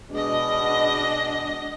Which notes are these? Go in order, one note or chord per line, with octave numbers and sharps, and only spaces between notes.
B2 G#3 D4 D#5